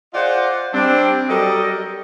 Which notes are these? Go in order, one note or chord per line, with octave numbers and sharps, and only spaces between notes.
F4 G#4 C5 D5 D#5 F#5
G3 C4 D4
F#3 G3 G4 A4 A#4 D#5